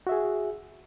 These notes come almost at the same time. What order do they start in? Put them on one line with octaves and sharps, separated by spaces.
F#4 E5 G#4